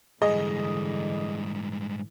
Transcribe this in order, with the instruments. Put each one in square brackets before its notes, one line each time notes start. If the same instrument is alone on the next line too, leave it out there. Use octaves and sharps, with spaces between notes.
[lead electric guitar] G#2 G3 [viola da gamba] D3 E3 [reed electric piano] G#4 [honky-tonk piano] D#5